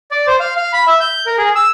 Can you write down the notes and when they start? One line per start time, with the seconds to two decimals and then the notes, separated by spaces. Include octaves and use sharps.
0.11 D5
0.27 C5
0.40 F5
0.57 F5
0.73 B5
0.87 E5
1.00 G6
1.26 A#4
1.38 G#4
1.56 E6